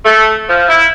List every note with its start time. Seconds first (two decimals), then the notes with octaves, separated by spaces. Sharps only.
0.05 A3
0.49 F3
0.69 E4